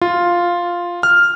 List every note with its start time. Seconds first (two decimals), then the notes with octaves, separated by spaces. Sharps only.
0.01 F4
1.03 F6